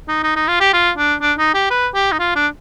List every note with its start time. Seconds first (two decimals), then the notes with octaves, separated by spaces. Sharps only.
0.08 D#4
0.24 D#4
0.36 D#4
0.48 F4
0.60 G4
0.74 F4
0.98 D4
1.22 D4
1.39 D#4
1.54 G4
1.71 B4
1.95 G4
2.12 D#4
2.19 F4
2.36 D4